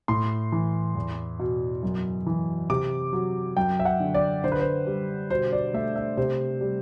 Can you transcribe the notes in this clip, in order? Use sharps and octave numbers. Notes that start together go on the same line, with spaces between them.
A2 C6
E3
E2
B2
F#2
E3
C3 D6
F#3
F#2 G5
E5
F#5
D3
D5
D3 C5
B4
C5
G3
B2 C5
D5
A3 E5
E5
C3 C5
G3